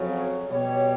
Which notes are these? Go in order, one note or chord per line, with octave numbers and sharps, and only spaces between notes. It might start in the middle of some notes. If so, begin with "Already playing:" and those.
Already playing: F2 C#3 F#3
C#5
B2 G3 C#5